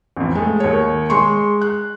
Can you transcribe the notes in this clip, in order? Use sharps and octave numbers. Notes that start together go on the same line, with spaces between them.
A1 F2
G#3 A3
D#2 C#5
G#3 C6 C#6
F#6